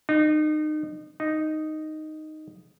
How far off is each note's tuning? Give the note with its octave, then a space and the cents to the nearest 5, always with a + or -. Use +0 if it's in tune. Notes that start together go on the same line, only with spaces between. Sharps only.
D#4 -30
D#4 -5